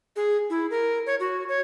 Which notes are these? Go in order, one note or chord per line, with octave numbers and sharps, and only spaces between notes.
G#4
E4
A#4
C#5
F#4
C#5